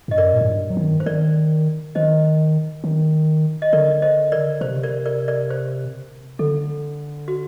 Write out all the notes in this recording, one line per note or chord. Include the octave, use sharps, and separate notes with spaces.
G2 D#5
F#2 A#4 D5
A#2
A2
G2
F#3
D#3
C5
D#3 A#4 D5
D#3 C5 D#5
D#3
D#5
D3 A#4 D5
C5 D#5
A#4 D5
C3 C5
A#4 D5
A#4 D5
A#4 D5
C5
D3 A4
F#4